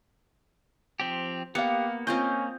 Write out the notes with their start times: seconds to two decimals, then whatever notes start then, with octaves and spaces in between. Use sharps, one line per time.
1.00 F3 C4 G4
1.55 A#3 B3 G4 F5 C#7
2.07 C4 C#4 F4 D#5 G6